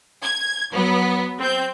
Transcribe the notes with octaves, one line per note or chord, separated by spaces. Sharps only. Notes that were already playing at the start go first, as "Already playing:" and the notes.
G#6
F#3 B3
C4 G6